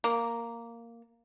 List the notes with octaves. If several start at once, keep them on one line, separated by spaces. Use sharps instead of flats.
A#3